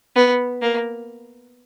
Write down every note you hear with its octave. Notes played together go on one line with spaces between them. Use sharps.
B3
A#3